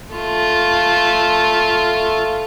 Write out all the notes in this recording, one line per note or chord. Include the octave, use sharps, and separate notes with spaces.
A3 F4